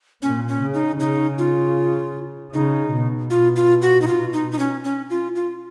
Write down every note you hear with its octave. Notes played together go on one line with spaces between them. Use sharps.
A#2 C#4
C#4
C#3
D#4
C#3 D#4
F4
C#3 D#4
B2
B2 F4
F4
F#4
D#4
B2 F4
D#4
D#4
C#4
C#4
F4
F4